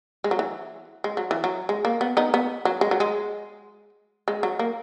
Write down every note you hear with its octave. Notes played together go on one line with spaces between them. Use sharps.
G#3
F#3
E3
G#3
F#3
E3
F#3
G#3
A#3
B3
B3 D#4
B3
F#3
G#3
F#3
G#3
G#3
F#3
A#3